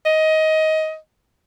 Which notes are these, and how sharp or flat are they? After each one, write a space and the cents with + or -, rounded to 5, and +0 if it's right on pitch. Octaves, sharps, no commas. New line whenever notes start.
D#5 +15